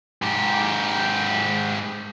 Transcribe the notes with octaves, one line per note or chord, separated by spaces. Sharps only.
G#2 G4